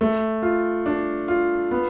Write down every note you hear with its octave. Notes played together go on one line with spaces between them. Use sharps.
A3
F4
D4
F4
B3